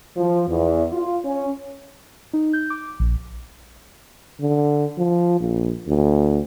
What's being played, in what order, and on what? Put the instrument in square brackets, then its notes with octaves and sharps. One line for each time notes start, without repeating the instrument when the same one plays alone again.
[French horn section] F3
E2
F4
C#4
[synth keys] D#4
G6
D6
A#1
[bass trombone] D3
F3
A#1
D2